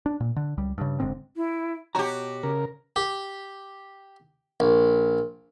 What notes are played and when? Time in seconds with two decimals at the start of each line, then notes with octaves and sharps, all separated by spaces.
0.06 D4
0.20 A#2
0.36 D3
0.57 C#2 G3
0.78 G2 C#3
1.00 F#1 G#2 D3 C4
1.36 E4
1.95 B2 F#4 G4 C#5 A#5
2.43 C#3 A#4
2.96 G4
4.60 A#1